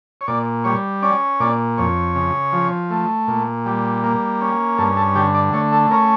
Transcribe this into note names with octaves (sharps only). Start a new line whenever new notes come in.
C#5
A#2 D5
G3 C#5
C#4 D5
A#2 D5
F2 C#5
C#3
F3
A3
A#2
G3
A#3
C#4
G2 A4
A4
D3 G4
D5
A3 C#5
A4
C#4 A#4